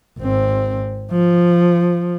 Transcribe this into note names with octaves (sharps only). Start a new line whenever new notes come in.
G#1 C4
F3